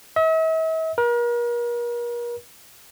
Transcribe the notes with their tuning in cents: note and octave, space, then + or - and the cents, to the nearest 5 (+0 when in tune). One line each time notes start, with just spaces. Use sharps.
E5 -45
A#4 +40